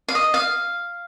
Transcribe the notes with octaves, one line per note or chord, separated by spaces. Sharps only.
F5
D#5
F5